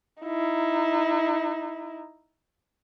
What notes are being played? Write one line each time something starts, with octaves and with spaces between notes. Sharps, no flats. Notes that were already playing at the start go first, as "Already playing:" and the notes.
D#4 E4